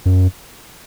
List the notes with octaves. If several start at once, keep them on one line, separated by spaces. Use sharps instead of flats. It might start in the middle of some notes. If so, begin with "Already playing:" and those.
F#2